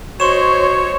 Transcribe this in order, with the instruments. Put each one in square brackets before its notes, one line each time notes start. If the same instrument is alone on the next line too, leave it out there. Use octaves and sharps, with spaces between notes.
[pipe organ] F#4 [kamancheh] C5 D#5 [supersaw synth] C#5 [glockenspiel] C6 C#6 E7